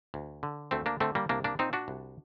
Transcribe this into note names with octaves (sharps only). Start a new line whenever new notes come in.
D2
D3
D2 A3 C4
A#3 D4
D3 A3 C4
G3 A#3
C2 A#3 D4
A#3 D4
A#2 C4 D#4
D4 F#4
C2